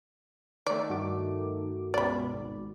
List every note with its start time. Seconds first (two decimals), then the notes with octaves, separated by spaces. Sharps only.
0.66 D#3 A3 D5
0.89 G2 F#4 D6
1.94 C#2 B2 D5 B5
2.29 G#1